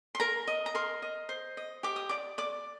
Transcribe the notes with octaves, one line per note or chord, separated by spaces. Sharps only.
C6
A#4 A#5
D#5
A#5
A#4 C6
D#5
C5
D#5
G4 D6
D#6
D5 D6
D5 D6